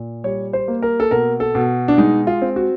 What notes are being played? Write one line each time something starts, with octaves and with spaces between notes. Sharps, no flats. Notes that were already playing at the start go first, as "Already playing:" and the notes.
Already playing: A#2
G3 C#5
C5
A#3
A#4
A4
B2 A#4
A4
B2
D4
G#3 D#4
F4
C4
F#4